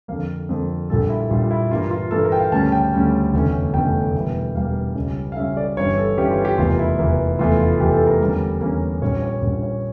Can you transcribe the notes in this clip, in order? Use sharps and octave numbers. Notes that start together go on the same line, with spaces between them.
F2 D3 F3 A#3 F5
F2 D3 F3 A#3
A#1 A#2 G3 A4
E4
A#1 A#2 G3 F4
E4
G2 E3 A#3 F4
F4
G2 E3 A#3 A4
A#4
G5
F5
D2 C#3 G3 C#4 A5
G5
D2 C#3 G3 C#4
F1 E2 D3 A3 C#4
F1 E2 D3 A3 C#4 G5
E1 E2 E3 G3 A#3
E1 E2 E3 G3 A#3 F5
C#2 C#3 G3 C#4
F5
C#2 C#3 G3 C#4 E5
D5
G1 G2 E3 G3 C#4 C#5
A4
G1 G2 E3 G3 C#4 G4
F4
G4
F1 E2 E3 A#3 F4
E4
F1 E2 E3 A#3
F1 E2 E3 A3 F4
F4
F1 E2 E3 A3 G4
A4
A#4
E2 D3 G3 A#3 C#4
E2 D3 G3 A#3 C#4
A#1 A#2 G3 C#4 C#5
C#5
A#1 A#2 G3 C#4
C#5